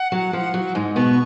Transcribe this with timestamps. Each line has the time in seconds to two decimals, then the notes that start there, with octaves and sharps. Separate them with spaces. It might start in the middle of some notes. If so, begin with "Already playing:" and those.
Already playing: F#5
0.12 F#3
0.33 F3
0.54 F#3
0.75 G#2 G#3
0.96 B2 B3 C#6